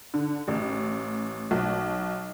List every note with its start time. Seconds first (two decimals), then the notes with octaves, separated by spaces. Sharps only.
0.14 D3
0.48 A1
1.51 B1